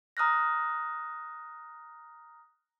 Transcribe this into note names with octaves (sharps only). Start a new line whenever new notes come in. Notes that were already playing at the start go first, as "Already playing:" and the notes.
A#5 D#6 F6 F#6 A#6